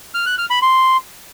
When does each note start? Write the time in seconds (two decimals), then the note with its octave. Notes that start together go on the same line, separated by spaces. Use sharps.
0.14 F6
0.26 F#6
0.38 F6
0.50 B5
0.62 C6